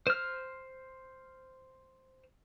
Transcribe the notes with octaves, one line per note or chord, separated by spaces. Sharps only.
C5 F6